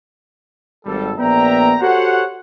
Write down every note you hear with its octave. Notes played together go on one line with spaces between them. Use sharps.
G#1 G3 A4
A#1 B3 D5 E5 G5 A#5
F#4 G4 A4 C5 C#5 F#5